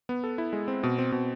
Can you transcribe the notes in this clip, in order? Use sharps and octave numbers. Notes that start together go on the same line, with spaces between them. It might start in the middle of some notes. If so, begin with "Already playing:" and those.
B3
A4
E4
G#3
C4
B2
C4
B2